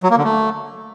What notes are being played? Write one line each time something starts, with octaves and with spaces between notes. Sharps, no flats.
F#3
A#3
D3
A3